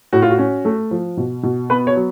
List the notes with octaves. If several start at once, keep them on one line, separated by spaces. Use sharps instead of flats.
A2 F#4
F4
F#4
C#4
A3
F3
B2
B2
B3 B4
C#5
F#3